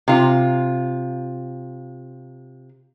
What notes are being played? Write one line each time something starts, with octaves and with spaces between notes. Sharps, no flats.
C3 F4